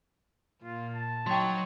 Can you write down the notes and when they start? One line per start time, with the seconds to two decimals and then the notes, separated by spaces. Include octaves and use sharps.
0.63 A#2 F4
0.95 A5
1.27 F#3 D#4 C#5 G5 C6